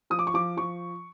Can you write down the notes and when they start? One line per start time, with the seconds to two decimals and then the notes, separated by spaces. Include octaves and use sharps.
0.10 F3 D#6
0.19 D6
0.27 C#6
0.34 F3 D6
0.57 F3 C#6